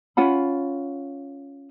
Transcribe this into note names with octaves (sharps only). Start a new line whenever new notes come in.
C#4 F4 F#5 B5